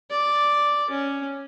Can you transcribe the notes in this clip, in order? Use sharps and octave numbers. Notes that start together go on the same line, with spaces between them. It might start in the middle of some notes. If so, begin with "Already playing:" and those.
D5
C#4